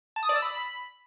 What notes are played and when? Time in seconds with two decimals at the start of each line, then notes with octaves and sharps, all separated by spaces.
0.16 A5
0.23 D#6
0.29 D5
0.36 E6
0.42 B5